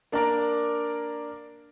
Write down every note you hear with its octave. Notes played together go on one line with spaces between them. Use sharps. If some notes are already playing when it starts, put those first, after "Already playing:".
A#3 D4 A#4 D5